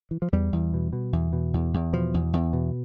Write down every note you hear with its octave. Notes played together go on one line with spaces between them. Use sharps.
E3
F3
E2 G3
E2
B2
B2
E2
B2
E2
E2
B2 F3
E2
E2
B2